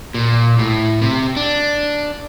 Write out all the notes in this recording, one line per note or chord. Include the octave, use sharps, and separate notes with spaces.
A#2
A2
C3
D4